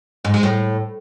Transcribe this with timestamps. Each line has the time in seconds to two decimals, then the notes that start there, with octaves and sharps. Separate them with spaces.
0.25 G#2
0.34 G#3
0.43 A2